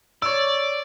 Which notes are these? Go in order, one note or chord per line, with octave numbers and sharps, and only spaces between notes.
C#5 D5 E6